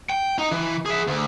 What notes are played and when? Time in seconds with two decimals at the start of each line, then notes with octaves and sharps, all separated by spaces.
0.10 G5
0.38 D#4
0.51 E3
0.86 G#4 E5
1.07 D2